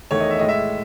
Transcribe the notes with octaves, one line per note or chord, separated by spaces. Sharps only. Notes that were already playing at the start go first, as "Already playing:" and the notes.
E2 D#3 A3 C#5
D#5
E5
A2 G#3 D#5
E5